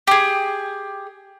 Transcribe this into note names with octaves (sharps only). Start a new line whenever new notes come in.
G4 G#4